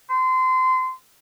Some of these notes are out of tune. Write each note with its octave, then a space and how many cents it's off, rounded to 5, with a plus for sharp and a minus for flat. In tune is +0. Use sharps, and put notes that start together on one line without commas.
C6 -25